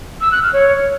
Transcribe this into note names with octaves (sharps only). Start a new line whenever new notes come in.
E6
F#6
F6
C#5